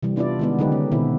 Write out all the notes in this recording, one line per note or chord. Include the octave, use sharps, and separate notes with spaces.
C3 E3 G3
B3 D4 E4 F4 D5
D#3 G#3 B3
D3 F#3 G#3 D#4 G4 B4
C#4
B2 D#3 E3 B3 C4 E4